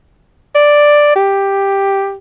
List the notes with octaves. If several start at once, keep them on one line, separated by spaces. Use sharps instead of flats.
D5
G4